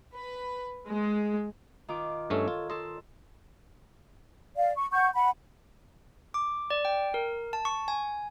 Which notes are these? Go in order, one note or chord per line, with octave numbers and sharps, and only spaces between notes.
B4
G#3
D#3 F4 D6
G2 A3 C#4 A4 C#5
F4
A4 D#5 C6
D5 F5
C#6
F#5 C#6 G6
F#5 B5
D6
D5
G5
A#4
A5
C#6
G#5